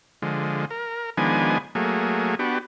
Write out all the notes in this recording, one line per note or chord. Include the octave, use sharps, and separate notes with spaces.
D3 F3 G#3
A#4
D#3 F3 G#3 B3 D4 G#5
F#3 A3 A#3 G#4
B3 D4 F#4 G4